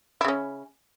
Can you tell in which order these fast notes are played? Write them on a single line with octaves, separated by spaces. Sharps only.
E4 C#3 C#4